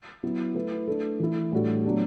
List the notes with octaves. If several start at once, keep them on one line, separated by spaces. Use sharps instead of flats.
F#3 B3 E4
A3 E4 B4
A3 D4 A4
E3 A3 E4
A2 G3 D4 F#4 A4
A2 F#3 B3 D4 G4